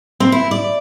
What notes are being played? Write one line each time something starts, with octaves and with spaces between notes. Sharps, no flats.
C4
E4
D5